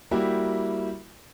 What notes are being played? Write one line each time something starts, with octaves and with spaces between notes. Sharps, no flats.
G3 A#3 E4 F#4 G4 E5